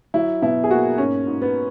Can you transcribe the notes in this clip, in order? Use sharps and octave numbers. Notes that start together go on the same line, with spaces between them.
F#3 E4
B2 E4
G#4
A#3 F#4
G#2 C#4
G#2
B3